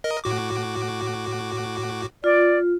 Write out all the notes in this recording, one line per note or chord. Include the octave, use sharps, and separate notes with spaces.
A#4 D#5
A2 F#4 D6
F4 D5